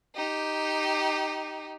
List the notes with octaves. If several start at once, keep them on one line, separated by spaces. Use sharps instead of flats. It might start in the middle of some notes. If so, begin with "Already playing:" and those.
D#4 G4